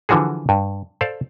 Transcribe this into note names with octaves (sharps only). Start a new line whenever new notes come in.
D3 E3 F3 F#4 G#4
G2
A4 C5 D5 F5